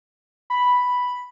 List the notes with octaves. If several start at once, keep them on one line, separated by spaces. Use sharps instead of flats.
B5